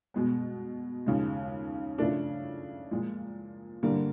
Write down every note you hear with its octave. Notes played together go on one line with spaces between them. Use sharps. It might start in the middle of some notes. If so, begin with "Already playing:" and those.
B2 G#3 B3
D#2 C#3 F3 G#3
C#3 F3 A3 D4
A#2 F3 G#3
G2 D3 G3 A#3